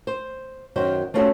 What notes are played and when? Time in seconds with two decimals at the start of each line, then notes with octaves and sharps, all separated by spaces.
0.07 C5
0.76 F#2 D#3 F#4 C5
1.14 A3 C4 C#4 F4 F#4 A4